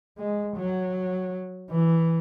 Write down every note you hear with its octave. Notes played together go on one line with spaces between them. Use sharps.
G#3
F#3
E3